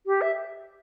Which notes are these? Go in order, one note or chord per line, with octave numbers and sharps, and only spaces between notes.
G4
E5